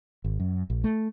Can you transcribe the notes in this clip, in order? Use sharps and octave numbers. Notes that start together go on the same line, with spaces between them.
G#1
F#2
A#1
A3